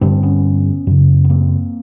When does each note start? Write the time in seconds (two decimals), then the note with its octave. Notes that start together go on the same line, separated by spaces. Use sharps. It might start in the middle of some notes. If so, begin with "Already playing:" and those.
0.01 G2 D3 C4 D4
0.22 B3 C#4
0.87 F#2 C#3
1.24 B3
1.30 A#3 C4